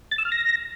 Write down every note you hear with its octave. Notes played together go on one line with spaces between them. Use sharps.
A6
E6
F6
A#6